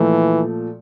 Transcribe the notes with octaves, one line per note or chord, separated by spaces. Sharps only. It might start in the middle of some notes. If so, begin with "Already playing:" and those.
Already playing: A#2 E3 F3 A3